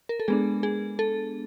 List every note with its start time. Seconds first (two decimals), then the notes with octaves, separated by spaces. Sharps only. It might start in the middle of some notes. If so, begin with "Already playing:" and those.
0.09 A#4
0.20 A4
0.28 G#3 B3 D4 G#4
0.63 G#4
0.99 A4